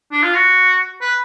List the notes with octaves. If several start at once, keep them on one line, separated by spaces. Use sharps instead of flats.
D4
F4
F#4
B4